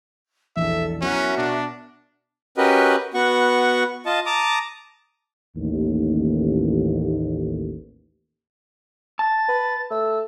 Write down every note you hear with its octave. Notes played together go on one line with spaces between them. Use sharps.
E1 A#1 E3 A4 E5
F#3 B3 C#4 E4 F#4 A#4 E5
B2 D4
C#4 F#4 G4 A#4 B4 D#5
B3 F#4 F#5 C#6
F4 D#5 A5
A5 A#5 D6 D#6
A1 D#2
A5 A6
B4
A3 E6